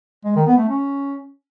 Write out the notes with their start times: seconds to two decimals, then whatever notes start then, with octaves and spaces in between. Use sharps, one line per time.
0.25 G#3
0.36 D#3
0.47 B3
0.57 A3
0.68 C#4